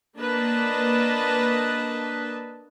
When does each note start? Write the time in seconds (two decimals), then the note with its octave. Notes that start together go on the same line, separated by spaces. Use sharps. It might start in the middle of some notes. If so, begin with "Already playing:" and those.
0.19 A#3 D4 B4 D#5 A5